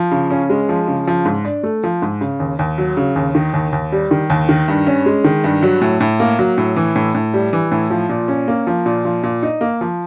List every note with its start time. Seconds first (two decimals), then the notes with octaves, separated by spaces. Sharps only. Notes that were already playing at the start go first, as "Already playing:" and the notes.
Already playing: F3
0.11 C#3
0.31 C#4
0.50 G#3
0.69 F3
0.88 C#3
1.07 F3
1.25 G#2
1.45 D4
1.63 A3
1.84 F3
2.02 G#2
2.21 C#3
2.40 D#2
2.59 D#2
2.78 F#3
2.97 C#3
3.16 D#2
3.35 D#3
3.53 D#2
3.73 D#2
3.92 G3
4.11 D#3
4.30 D#2
4.49 D#3
4.68 G2
4.87 C#4
5.06 G#3
5.24 D#3
5.44 G2
5.63 F#3
5.82 A2
6.00 A2
6.20 A#3
6.39 F#3
6.58 A2
6.76 E3
6.96 A2
7.15 A2
7.34 G3
7.53 E3
7.72 A2
7.90 F3
8.09 A#2
8.28 C#4
8.48 A#3
8.67 F3
8.86 A#2
9.05 F3
9.23 A#2
9.42 D#4
9.61 A#3
9.81 F3